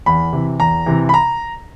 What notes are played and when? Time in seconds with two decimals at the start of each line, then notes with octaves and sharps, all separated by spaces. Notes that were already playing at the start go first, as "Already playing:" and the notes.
0.06 E2 B5
0.33 C3 E3
0.60 E2 A#5
0.86 C3 E3
1.09 B5
1.14 A#5